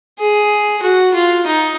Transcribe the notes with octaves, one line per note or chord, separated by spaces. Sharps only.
G#4
F#4
F4
D#4